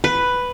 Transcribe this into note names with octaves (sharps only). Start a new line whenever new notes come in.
B4